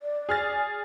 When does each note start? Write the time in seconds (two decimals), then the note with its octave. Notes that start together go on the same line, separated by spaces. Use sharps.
0.02 D5
0.29 G#4 F6 A6